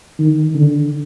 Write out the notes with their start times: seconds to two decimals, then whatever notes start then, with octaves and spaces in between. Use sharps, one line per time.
0.19 D#3
0.55 D3